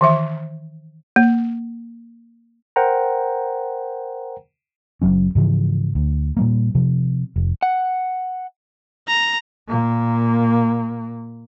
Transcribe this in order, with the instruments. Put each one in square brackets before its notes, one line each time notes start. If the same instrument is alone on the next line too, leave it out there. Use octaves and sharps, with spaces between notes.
[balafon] D#3 E3 E5
A#3
[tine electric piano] A#4 C5 F#5 G5 A#5
[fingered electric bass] F#1 E2 F#3 C#4
G#2 C#3 E3 F3
D2
A#2 G3 A#3
C3 F3
F1
[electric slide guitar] F#5
[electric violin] A#5
[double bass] A#2 A#3